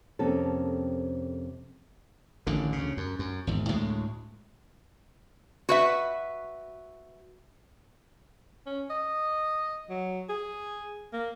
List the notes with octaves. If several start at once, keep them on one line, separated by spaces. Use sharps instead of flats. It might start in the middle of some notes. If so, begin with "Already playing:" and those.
F2 C3 A#3 C4 C#4 A4
A1 D3 D#3
D2 C#3
F#2
F#2
G#1 E2
D2 A2 G#3
F#4 B4 E5
C#4
D#5
F#3
G#4
A#3